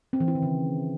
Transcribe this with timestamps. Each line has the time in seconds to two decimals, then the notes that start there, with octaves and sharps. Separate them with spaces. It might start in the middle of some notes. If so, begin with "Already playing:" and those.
0.13 C4
0.20 E3
0.28 E4
0.35 D#3
0.42 C#3